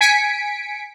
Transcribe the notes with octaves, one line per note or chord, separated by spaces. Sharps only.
G#5 B6 C#7 D7